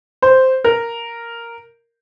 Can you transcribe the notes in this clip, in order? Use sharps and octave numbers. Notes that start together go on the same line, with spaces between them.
C5
A#4